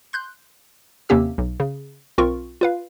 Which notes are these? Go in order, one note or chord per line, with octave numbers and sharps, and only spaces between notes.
C6 F#6 G6
D#2 C3 A#3 C#4 G4 E6
B1
C#3
B1 C4 F4 A#4 C#6
F4 B4 F5